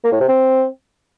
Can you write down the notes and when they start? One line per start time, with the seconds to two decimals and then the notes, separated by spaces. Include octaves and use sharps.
0.04 A#3
0.12 A2
0.20 C3
0.28 C4